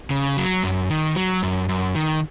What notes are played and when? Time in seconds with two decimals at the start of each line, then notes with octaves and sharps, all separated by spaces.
0.10 C#3
0.37 F#3
0.63 F#2
0.90 D#3
1.16 F#3
1.43 F#2
1.69 F#2
1.95 D#3